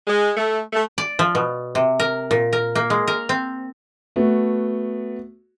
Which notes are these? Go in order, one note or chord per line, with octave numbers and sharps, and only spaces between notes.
G#3
A3
A3
D5
F3
B2
C3
A#4
A#2
A#4
A#3
G#3
A#4
C4
A3 B3 F#4